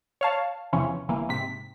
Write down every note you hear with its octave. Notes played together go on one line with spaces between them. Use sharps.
C#5 F5 A5
E2 C3 E3 F3 C#4
G1 E3 A#3
G#2 C3 B6